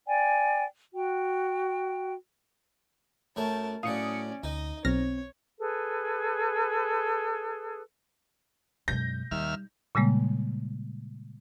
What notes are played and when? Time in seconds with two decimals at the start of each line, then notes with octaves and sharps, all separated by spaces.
0.07 D5 G5 G#5
0.94 F#4 G5
3.36 F#2 A3 A#4 C#5 A5
3.83 A2 F#3 C#4 D5 F5 D#6 C#7
4.44 D2 D#4 D#5
4.85 B1 C4 C#5 F6 A#6
5.59 G#4 A4 B4
8.88 F#2 B2 G#3 G6 A#6
9.31 D#2 G3 D#4 E5 F6
9.95 A#2 C#3 G3 G#3 A#3